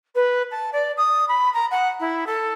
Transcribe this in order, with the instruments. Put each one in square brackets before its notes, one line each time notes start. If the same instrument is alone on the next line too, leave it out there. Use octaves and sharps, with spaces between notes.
[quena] B4
A5
D5
D#6
B5
A#5
F#5
E4
A4